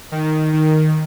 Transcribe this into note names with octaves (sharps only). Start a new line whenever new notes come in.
D#3
D#3